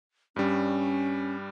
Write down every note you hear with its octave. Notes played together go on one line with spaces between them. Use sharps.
G2 G3 C#4